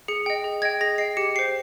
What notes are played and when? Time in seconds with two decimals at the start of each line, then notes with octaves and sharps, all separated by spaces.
0.08 G#4 C#7
0.26 D#5 G5
0.44 G#4
0.62 D#5 G5 G#6
0.81 G#4 A#6
0.98 D#5 G5 C7
1.17 G4 C#7
1.35 C5 G5 C7